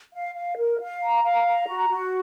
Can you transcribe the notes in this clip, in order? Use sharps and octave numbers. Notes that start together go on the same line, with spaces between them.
F5
F5
A#4
F5
A#5
F5
A#5
F#4
F#4